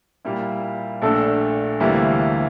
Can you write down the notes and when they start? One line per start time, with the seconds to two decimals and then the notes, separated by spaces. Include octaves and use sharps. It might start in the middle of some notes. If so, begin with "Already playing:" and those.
0.25 A#2 G3 A#3 E4
1.02 A#1 A#2 A3 D4 A4
1.80 D2 C3 E3 G3 A#3